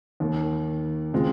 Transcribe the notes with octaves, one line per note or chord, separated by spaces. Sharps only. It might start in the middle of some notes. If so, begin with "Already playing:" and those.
D#2 D#3 A#3
C#3 G#3 C4 F4